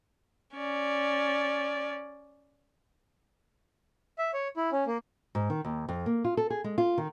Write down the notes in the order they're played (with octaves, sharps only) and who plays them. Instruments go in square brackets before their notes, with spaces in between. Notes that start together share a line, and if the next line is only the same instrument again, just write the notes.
[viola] C#4 D5
[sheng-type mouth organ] E5
C#5
E4
C#4
A#3
[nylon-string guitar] G#2
D#3
D#2
F2
A#3
F4
A4
G#4
G#3
F4
D#3